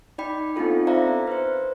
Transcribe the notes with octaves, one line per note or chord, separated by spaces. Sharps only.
D#4 D5 G5 B5
B3 C4 D4 D#4 F4 A4
C5 D5 E5 F5 A#5
B4 C5